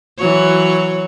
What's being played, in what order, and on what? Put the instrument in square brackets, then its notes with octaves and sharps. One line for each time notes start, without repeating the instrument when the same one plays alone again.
[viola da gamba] E3 F#3 C#5